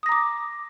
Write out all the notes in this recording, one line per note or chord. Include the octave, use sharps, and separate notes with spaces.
A#5 D6 D#6 A#6